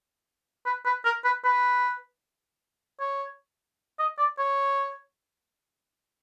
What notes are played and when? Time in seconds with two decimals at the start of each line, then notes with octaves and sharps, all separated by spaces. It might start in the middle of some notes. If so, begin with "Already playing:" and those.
0.66 B4
0.85 B4
1.05 A#4
1.24 B4
1.45 B4
3.00 C#5
3.99 D#5
4.18 D5
4.38 C#5